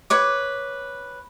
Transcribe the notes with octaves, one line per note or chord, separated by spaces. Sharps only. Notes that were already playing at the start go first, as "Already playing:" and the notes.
B4 C#5 D6